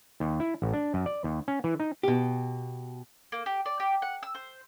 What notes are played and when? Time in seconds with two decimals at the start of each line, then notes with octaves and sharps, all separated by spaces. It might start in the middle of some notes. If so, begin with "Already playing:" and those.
0.20 D#2
0.40 E4
0.62 A1
0.74 D4
0.94 F#2
1.06 D5
1.24 D#2
1.48 C#4
1.64 E3
1.80 D#4
2.03 B2 G4
3.32 A#3
3.46 G4
3.66 D5
3.80 G4
4.02 F#5
4.23 E6
4.35 C5